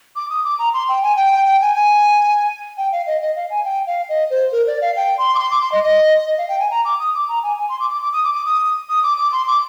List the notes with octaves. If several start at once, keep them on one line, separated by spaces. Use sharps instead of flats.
D6
D#6
D6
A#5
C6
G5
G#5
G5
G5
G5
G#5
G#5
G5
F5
D#5
D#5
F5
G#5
G5
F5
D#5
C5
A#4
D5
F5
G5
C6
D6
C6
D6
C6
D#5
D#5
D#5
F5
G5
G#5
A#5
D6
D#6
D6
A#5
G#5
G#5
C6
D6
D6
D6
D#6
D6
D6
D#6
D#6
D6
D6
C6
D6